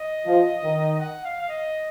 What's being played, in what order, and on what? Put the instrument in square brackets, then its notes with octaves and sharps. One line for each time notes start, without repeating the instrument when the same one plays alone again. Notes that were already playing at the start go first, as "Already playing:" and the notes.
Already playing: [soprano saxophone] D#5
[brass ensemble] F3
D#3
[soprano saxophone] F#5
F5
F5
D#5